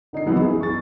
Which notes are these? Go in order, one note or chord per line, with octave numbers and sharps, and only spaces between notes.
D3 D#4 D#5 C7
F#2 E3 F#3 B3 D#4 E4
G#4
C#6 A6